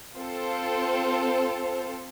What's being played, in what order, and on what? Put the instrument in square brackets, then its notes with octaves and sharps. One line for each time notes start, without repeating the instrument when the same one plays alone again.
[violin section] C4 F4 A4 C5